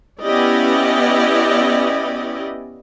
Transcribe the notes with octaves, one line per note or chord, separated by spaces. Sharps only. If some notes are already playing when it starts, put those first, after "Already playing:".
B3 C#4 E4 G4 D5 D#5